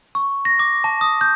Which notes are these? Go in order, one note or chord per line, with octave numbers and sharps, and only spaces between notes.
C#6
A#6
D6
A5
D#6
G6